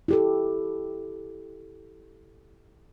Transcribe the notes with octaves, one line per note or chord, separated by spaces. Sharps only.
E4 G4 A4